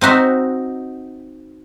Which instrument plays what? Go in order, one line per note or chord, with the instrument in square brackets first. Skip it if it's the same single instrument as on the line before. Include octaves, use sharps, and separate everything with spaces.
[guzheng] C4 D#4 F#4 E5